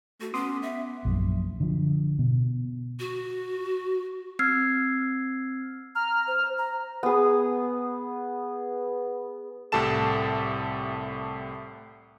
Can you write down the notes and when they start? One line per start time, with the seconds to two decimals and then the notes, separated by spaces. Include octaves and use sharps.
0.21 A3 F#4
0.34 B3 C#4 C6 D6 D#6
0.63 E5
1.05 A#1 F#2 A#2
1.60 D3 F3
2.19 B2
3.00 F#4
4.39 C4 E6 F6 G#6 C7
5.95 A#5 F6
6.28 C5
6.58 A#5
7.03 B3 G#4
9.72 C2 A2 G4 A4 A5 E7